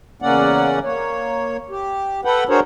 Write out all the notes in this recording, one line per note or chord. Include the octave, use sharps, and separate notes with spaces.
E2 C#3 A#3 C#4 D5 F#5
A#3 C#5
G4
A4 B4 F#5 G5
D4 F#4 G#4 A#4 C5 C#5